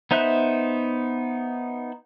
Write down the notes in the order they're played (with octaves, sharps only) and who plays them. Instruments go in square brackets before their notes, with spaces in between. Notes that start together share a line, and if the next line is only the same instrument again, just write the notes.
[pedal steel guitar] B3 D#4 C5 E5 F#6